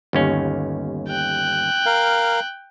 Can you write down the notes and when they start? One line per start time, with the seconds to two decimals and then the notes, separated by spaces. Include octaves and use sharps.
0.13 G1 D#2 C#4
1.08 G5 F#6
1.86 A#4 F5